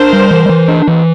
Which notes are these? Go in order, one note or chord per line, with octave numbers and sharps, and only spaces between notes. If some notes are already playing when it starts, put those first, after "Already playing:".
Already playing: D4 A#4 C5
G3
E3
E3
D4
E3